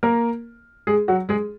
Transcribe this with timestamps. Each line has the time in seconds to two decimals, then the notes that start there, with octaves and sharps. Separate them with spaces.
0.03 A#3 A#4
0.87 G#3 G#4
1.08 F#3 F#4
1.29 G#3 G#4